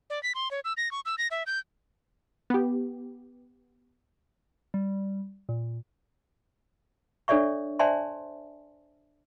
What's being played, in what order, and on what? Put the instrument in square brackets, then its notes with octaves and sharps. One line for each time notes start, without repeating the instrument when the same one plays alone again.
[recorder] D5
B6
C6
C#5
E6
A#6
C#6
E6
A#6
E5
G6
[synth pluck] B3 G4
[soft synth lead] G3
A#2
[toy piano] D4 A4 C#5 D5 E5 C#6
C5 D5 E5 G#5 A5 C6